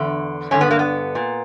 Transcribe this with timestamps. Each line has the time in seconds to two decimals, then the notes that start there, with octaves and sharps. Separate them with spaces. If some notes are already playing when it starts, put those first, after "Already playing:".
Already playing: E2 D3
0.51 G2 D3 C#4
0.61 B3
0.71 A#3
0.79 B3
1.15 A#2